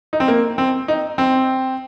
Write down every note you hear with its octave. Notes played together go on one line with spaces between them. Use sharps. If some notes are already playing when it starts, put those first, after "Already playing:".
D#4
C4
A#3
C4
D#4
C4